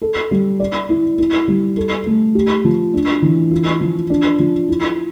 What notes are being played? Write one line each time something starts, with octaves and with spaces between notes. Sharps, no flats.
A4
G3
D5
E4
E4
G3
A4
A3
G4
F3
D4
E3
F4
F3
D4
F3
E4